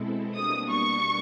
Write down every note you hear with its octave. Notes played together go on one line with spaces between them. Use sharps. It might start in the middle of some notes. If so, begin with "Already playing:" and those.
Already playing: B2 G#3 C4 E4 A4
B2 G3 A#3 D4 D#6
C#6